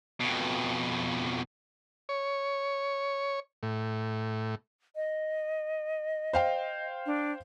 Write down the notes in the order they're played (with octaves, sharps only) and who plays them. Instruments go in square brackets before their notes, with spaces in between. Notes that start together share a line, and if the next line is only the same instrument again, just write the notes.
[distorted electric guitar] F2 B2
[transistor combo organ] C#5
A2
[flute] D#5
[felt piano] C5 F5 G5
[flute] D4